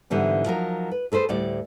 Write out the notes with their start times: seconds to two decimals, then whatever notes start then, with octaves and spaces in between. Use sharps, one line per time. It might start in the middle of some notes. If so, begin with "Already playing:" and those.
0.10 G#2 D3 E3 G3 B3
0.46 F3 F#3 D#4 A#4
0.91 B4
1.12 G#4 A4 B4 C5
1.29 D2 A2 G3 D5